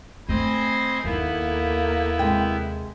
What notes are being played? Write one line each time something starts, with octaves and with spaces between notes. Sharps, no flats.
A3 C4 C5 D#5 G#5 B5 G#6
D#2 A#3 B3 E4 A4
C3 G#3 G5